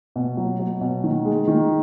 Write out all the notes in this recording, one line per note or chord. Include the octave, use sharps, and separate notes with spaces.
B2
F#3
F#3
B2
D#3
G#3
D#3